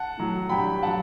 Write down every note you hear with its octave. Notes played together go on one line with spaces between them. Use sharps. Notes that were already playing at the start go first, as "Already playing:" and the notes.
Already playing: F#5 A5
A2 F#3
G2 F#3 G5 B5
F#3 F#5 A5